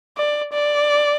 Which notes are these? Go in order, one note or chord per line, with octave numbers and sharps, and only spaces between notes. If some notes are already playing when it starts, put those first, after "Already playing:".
D5
D5